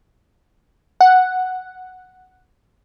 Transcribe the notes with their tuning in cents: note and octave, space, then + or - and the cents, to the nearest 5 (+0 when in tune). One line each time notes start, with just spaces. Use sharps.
F#5 +0